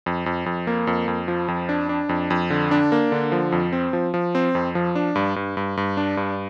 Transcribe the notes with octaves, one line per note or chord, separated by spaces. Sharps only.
F2
F2
F2
A#3
F2
F2
F3
F2
D4
D4
F2
F2
D3
D4
A#3
D3
F3
F2
C4
F3
F3
C4
F2
F3
D4
G2
G2
G2
G2
D4
G2